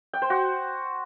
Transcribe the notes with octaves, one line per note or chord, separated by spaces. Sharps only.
G5
C5
F#4